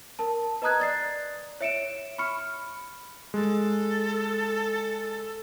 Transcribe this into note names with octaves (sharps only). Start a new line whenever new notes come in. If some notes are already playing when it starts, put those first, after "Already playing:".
A#4 A5
B4 D#5 A#5 D#6 F#6 G#6
D5 A6 C7
C#5 E5 C#7 D7 E7
B5 C#6 F6 C#7
G#3 A4